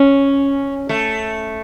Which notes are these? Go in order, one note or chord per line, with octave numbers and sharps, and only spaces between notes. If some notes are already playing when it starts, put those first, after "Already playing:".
Already playing: C#4
A3